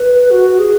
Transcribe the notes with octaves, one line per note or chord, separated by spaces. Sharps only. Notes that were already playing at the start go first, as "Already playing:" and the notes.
Already playing: B4
F#4
G#4